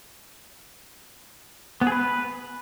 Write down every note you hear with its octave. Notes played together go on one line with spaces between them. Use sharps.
B3
G#4
B4